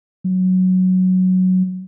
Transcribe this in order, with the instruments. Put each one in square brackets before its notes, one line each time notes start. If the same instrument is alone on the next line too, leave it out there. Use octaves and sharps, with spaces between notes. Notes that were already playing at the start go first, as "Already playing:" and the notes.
[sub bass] F#3